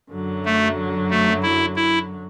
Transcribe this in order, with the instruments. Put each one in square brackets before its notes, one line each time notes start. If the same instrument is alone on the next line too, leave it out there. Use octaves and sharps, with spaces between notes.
[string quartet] F#2 D3 F#3
[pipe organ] A3
A3
E4
E4